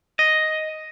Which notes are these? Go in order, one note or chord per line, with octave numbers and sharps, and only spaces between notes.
D#5